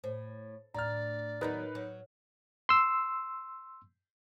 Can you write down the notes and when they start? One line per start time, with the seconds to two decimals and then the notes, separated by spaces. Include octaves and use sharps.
0.04 A2 C5
0.74 D2 A2 D5 A#5 F6
1.41 D#3 F#3 B3 D#4 A#4 B4
1.75 F#3
2.69 C6 E6